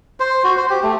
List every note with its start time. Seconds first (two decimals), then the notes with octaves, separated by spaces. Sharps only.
0.20 C5
0.44 F#4
0.57 C5
0.70 G4
0.83 A3